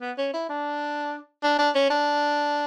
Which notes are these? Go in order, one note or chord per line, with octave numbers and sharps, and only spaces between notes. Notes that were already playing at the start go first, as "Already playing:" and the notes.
B3
C#4
E4
D4
D4
D4
C#4
D4